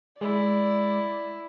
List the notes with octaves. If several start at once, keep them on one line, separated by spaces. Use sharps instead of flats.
G#3 E4 D5